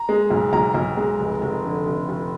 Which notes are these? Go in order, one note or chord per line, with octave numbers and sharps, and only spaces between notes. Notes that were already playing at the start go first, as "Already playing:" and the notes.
Already playing: A#5
G#3
B1
B1 A#5
B1
G#3
F1
F1
D3
F1
F1